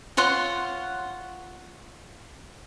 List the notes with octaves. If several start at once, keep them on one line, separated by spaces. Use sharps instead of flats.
F4 C#5 F#5 C6